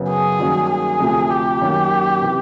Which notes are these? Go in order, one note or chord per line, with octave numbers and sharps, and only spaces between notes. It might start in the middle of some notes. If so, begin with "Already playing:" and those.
Already playing: F#2 C#3 F#3 B3
G#4
G2 D#3 F#3 A#3 C#4
G#4
D2 C3 F3 A3
G4
F#2 D#3 F#3 A#3 C#4
C3 E3